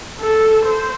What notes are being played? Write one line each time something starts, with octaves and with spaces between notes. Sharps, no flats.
A4
C5